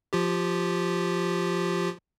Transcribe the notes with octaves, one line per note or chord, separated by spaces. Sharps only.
F3 F4 G4